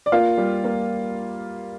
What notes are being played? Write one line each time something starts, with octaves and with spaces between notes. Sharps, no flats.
D5
A#3 F4 F5
G3
A#3